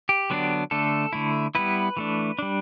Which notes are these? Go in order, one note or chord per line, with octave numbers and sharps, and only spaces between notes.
G4
D3 F#3 B3 D4
D3 A3 D4 A4
D3 A3 E4
G3 B3 E4 B4
E3 A3 D4
G3 D4